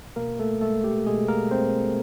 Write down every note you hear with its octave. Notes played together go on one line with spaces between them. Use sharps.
B2 A#3 A#4
A3 A4
G#3 A3 A4
G4
B2 G#3 G#4
A#3 A#4
G#3 C4 C5